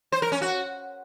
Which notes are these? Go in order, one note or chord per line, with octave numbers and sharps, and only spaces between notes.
C5
A#4
C#4
F#4